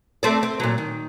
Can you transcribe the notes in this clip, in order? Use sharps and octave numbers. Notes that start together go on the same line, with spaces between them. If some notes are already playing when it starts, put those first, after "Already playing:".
A3 C4 D5
C4
A#2 F#3
D#3